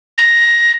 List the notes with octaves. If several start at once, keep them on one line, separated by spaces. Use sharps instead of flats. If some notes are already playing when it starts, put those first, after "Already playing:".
A#6